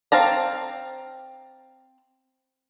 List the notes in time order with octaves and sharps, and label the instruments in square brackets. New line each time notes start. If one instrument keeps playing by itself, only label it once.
[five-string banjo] C4 F5 A5 A#5